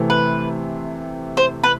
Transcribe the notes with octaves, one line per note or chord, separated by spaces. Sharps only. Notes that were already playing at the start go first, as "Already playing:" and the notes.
Already playing: C3 E3 A3 C4
B4
C5
B4